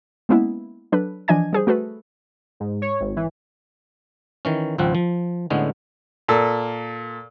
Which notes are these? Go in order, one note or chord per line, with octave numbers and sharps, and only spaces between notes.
G#3 A#3 B3 C#4 E4
F#3 D4 A4 B4
E3 F3 D4 D#5 G#5 G#6
G3 G#4 C5
A3 F#4 A4 B4
G#2
C#5
G#1
E3
D#3 E3 C#4
G#1 C#2 F3 C4 F#5
F3
A2 D3 G#3 B3 C#4
A#2 A4 E6